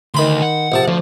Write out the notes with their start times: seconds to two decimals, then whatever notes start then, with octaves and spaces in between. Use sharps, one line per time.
0.14 D2 D#3 B5 C6
0.42 F#5
0.72 A#1 C3 A5
0.88 D2 F3